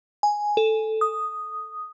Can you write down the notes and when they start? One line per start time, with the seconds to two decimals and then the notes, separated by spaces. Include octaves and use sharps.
0.23 G#5
0.57 A4
1.01 D#6